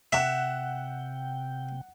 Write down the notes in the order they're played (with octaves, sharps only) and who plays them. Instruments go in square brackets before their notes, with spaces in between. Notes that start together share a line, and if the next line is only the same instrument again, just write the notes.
[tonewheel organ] C3 G5 [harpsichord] E5 [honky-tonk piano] F#5 E7